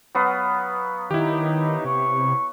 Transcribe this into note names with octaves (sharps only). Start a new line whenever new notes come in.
F#3 B3 F5
D#3 D#4 E4 G4
C3 C#6